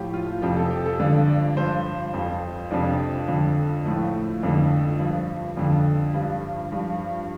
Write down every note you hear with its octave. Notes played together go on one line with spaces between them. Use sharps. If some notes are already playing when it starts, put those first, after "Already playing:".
Already playing: A2 F3 G4
F4
F2 C3 F3 G4
A4
G4
A4
G2 D3 F3 D5
D5
G2 F3 C5
F2 F3
F2 C3 F3 D4
F2 D3 F3
A2 F3 A3
F2 D3 F3
G2 F3
F2 D3 F3
G2 F3 G3
G2 F3